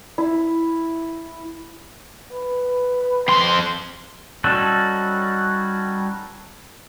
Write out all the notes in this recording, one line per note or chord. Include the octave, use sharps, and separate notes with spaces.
E4
B4
F2 C6
G3 C#4 D#4 F#4 A4